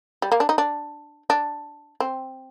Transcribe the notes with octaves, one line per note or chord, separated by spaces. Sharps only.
G3
A#3
D4
D#4
D4
D4
C4